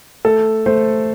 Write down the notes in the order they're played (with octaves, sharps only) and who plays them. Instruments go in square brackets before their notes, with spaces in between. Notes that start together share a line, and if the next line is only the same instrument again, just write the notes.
[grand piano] A3 A4
A3 C5